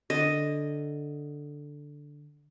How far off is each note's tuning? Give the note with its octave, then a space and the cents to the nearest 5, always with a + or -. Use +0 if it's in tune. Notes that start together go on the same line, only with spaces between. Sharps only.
D3 +0 D#5 +0